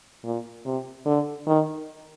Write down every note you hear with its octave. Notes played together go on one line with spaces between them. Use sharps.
A#2
C3
D3
D#3